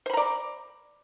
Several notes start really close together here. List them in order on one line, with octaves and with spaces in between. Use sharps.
C5 B5 A#5 D5